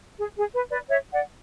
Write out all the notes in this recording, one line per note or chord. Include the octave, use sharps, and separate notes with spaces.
G#4
G#4
B4
B4 D5
C#5 E5
D5 F#5